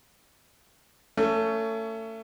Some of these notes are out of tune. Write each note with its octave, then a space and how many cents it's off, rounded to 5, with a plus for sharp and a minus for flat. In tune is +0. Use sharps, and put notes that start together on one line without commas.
A3 +30 C#4 +25